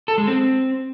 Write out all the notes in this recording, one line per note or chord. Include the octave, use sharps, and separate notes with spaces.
A4
G#3
C4